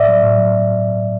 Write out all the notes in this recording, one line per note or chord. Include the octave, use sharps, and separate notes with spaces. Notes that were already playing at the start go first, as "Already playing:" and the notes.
Already playing: A2 D5 E5
F#3
A2
F#3